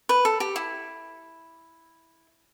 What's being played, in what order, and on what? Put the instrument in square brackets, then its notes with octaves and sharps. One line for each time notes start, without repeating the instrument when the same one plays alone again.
[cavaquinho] B4
A4
G4
E4